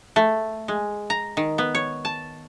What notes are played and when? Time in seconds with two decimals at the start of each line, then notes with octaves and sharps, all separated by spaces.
0.16 A3
0.68 G#3
1.10 A#5
1.37 D#3
1.58 B3
1.75 C#5
2.05 A5